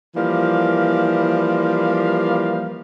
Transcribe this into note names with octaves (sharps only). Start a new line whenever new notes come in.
E3 F3 G3 A#3 F5